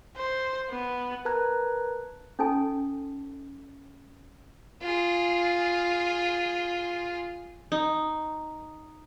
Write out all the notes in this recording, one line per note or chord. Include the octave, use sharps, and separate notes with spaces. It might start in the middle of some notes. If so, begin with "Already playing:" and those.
C5
B3
A#4 B4 A5 A#5 F#6 G#6
C#4 D#4 A4 G#5 A5
F4 G#4
D#4